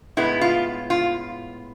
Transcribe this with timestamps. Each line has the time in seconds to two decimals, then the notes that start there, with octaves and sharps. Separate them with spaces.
0.17 A2 G#3 B3 E4
0.41 F4
0.90 F4